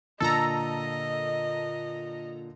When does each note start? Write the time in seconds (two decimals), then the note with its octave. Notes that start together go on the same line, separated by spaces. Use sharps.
0.21 A#2 D3 A4 D#5 A#5